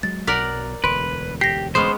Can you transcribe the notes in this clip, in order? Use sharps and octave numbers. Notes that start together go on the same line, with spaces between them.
F#3 G#3 A6
B1 F#3 A#4 D5 F#5 B6
E1 D2 D3 B4 C6 D7
G4 A#6 C7
G#3 B3 C#4 C5